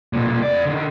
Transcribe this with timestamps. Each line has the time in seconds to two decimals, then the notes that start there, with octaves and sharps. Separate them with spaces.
0.13 B1 A#2
0.42 F2 D5
0.65 D3 D#3